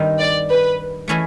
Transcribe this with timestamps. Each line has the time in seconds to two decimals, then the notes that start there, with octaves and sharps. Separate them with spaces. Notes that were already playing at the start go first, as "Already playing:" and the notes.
Already playing: G2 D#3 G3 C4 D#4
0.19 D5
0.49 B4
1.08 E3 A3 C#4 E4 G#4